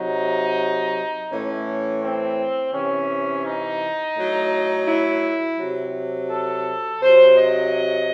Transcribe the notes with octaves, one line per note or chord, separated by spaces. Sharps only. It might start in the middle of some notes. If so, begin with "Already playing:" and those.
Already playing: C3 F#3 D#4
A2 E3 C#4
C4
C3 E3 C#4
D#4
A2 F#3
E4
C3 F#3
A4
C3 F#3 C5
D#5